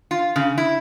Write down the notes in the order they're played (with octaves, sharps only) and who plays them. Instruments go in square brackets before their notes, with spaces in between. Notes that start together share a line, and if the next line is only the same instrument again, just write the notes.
[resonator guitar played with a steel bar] F4
C#3
E4